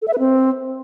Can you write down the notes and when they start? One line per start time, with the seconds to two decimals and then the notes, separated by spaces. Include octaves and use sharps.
0.02 A4
0.08 E5
0.13 B4
0.19 C4